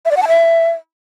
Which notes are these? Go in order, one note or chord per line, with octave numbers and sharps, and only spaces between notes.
E5
D5
F#5
A5
E5